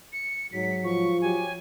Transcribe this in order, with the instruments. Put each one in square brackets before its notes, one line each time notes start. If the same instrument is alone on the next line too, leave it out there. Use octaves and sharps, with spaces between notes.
[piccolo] C#7
[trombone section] G#2 F#3 [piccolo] B6
[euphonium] F3 [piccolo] C#6
[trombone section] F#3 G4 [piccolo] G#5